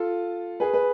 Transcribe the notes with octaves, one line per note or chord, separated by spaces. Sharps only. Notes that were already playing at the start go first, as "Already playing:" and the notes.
Already playing: F4 A4
G#4 B4
B4